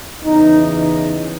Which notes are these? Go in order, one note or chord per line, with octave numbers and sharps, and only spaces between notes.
E2 C#3 E3 D#4
D#4